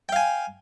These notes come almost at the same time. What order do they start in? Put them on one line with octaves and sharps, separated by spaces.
G5 F5 G#5